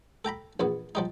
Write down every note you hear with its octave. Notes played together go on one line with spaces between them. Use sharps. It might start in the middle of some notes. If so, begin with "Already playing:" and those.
A4 G5 A#5 B5
A#1 E2 B3
F3 G3 D#4